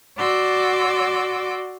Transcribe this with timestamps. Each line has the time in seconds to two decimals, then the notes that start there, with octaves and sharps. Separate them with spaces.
0.18 F#4 D5 C6 D6 E6